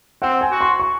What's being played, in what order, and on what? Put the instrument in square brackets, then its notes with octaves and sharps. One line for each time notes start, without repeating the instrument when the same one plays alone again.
[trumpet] C4 [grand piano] F#5
[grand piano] G#5
[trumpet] F#4
[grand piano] C6
C#6